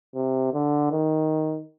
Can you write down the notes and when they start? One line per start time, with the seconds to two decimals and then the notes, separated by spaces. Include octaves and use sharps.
0.15 C3
0.53 D3
0.91 D#3